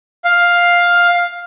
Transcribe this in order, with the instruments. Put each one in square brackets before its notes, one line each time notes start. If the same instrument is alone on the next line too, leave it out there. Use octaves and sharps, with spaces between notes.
[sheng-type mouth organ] F5